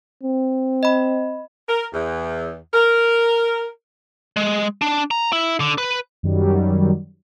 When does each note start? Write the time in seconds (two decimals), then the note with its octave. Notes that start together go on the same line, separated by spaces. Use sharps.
0.23 C4
0.83 D#5 B5
1.68 A#4
1.93 E2
2.73 A#4
4.36 G#3
4.82 D4
5.11 A#5
5.32 E4
5.60 D3
5.78 B4
6.23 F#2 D#3 F#3 G3